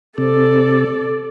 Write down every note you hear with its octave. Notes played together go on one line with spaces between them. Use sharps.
C3 A4 D5